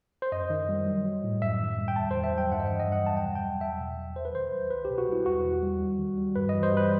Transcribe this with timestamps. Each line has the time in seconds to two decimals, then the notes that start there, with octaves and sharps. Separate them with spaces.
0.22 C5
0.32 F#2 D#5
0.50 D#3
0.69 G3
0.86 F#3
1.05 F#3
1.24 A2
1.42 F#2 E5
1.60 D#3
1.78 G3
1.88 G5
1.96 E2 A5
2.11 D#3 C5
2.24 E5
2.33 F#3 G5
2.52 G2 F#5
2.60 D#5
2.66 E3 E5
2.79 D#5
2.88 G3 F#5
3.06 E2 A5
3.17 G5
3.25 B2 F#5
3.36 G5
3.43 F#3
3.61 E2 E5
3.80 B2
3.97 F#3
4.16 D#2 C5
4.25 B4
4.34 D#3 C5
4.53 F#3
4.71 C2 B4
4.85 G4
4.90 B2
4.98 F#4
5.08 G3 E4
5.26 E2 F#4
5.45 D#3
5.63 G3
5.81 D#2
5.99 D#3
6.18 G3
6.36 G2 B4
6.49 E3 D#5
6.63 C5
6.72 G3 B4